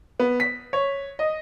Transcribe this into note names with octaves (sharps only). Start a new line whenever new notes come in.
B3
B6
C#5
D#5